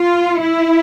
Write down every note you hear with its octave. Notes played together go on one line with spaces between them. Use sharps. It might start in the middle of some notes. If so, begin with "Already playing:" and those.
Already playing: F4
E4